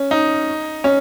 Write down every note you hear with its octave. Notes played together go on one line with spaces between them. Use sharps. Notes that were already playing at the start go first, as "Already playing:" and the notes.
Already playing: C#4
D#4
C#4